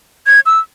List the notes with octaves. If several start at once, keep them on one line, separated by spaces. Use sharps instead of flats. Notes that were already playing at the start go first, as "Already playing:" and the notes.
G#6
E6